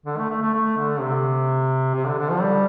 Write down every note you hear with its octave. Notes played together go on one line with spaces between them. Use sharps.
D3
A3
A3
A3
A3
D3
C3
C3
D3
D3
F3
G3